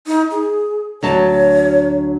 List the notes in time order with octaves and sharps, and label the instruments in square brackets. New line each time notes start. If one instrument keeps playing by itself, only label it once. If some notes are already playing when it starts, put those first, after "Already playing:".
[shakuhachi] D#4
G#4
[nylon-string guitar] D2 F#3 A5 [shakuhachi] C#5